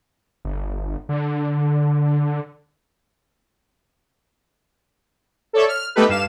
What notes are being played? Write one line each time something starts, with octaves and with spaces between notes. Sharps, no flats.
G1
D3
A4 C#5 D5 E5
F6
A3 B3 D#4 G4 A4 B4
G2 F5 E7